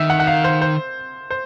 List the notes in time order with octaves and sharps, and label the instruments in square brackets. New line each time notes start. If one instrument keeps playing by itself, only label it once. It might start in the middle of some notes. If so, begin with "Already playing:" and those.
Already playing: [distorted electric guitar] D#3 [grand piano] E5
[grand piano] F#5
F#5
F5
C5
C5
C5